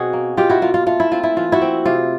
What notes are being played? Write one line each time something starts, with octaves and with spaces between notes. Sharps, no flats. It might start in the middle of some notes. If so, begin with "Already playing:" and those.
Already playing: B2 C4 F#4 G#4
A#3
B2 F4 G4
E4 F#4
A#3 F4
F4
A3 F4
E4
C4 F4
E4
E3 F4
E4 F#4
C4
C3 F4